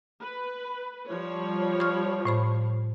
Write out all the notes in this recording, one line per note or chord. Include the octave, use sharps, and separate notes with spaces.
B4
F3 G3 C#5
C#6 F6
A2 C5 B5